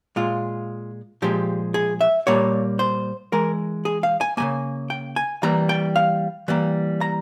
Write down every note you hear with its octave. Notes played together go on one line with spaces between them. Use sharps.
A#2 G#3 F4
A#2 F3 G#3 G4
G#4
E5
A#2 G3 A#3 C#5
C5
E3 G#3 A#4
G#4
F5
G#5
C#3 F3 A#3 G#5
G5
G#5
E3 G3 A#3 A#5
G5
F5
E3 G3 A#3
A#5